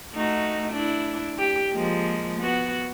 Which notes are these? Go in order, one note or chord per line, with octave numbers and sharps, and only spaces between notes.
A3 D#4 F#4
D4 E4
G4
F3 G#3 A#3
B3 F#4